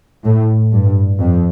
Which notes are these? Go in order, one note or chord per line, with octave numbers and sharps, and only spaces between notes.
A2
G2
F2